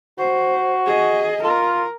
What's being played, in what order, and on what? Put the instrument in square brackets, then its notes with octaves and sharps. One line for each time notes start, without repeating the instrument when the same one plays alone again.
[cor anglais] F#4 [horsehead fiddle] C5
[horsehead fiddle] G#4 D#5
[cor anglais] F4 [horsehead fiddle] A#4